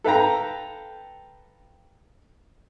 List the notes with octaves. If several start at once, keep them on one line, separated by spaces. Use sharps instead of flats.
A4 B4 F5 G5 A#5